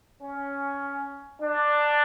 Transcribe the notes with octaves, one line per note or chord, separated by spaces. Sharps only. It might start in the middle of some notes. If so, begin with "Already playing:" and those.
C#4
D4